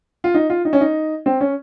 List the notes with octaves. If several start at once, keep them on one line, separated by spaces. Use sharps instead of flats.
F4
D#4
F4
D#4
C#4
D#4
C4
C#4